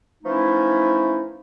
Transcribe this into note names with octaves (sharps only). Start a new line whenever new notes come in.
E3 F3 A3 C#4 D#4 E4